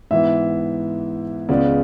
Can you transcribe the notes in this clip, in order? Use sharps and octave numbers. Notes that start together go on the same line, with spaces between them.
G#2 E3 B3 E5
C#2 C#3 G#3 B3 D5